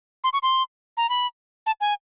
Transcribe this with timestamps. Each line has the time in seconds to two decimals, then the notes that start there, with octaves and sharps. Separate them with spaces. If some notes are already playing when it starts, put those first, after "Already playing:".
0.24 C6
0.33 C#6
0.43 C6
0.97 A#5
1.10 B5
1.66 A5
1.81 G#5